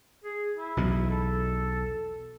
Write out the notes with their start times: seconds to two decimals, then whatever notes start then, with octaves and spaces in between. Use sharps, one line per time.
0.24 G#4
0.54 E4
0.77 B1 E2 B2
1.10 A4